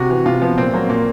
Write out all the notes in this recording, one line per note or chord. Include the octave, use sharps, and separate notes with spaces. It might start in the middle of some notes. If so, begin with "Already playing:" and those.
Already playing: C3 F#4
E3
C3 F4
F3 B3
A#2 C4
F#3 A#3
A#2 A#3